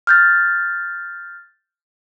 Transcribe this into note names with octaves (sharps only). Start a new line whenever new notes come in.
F6 G6 A6